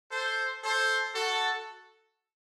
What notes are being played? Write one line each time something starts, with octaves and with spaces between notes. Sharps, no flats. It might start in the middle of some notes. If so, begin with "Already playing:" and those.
A4 C5
A4 C5
F#4 A4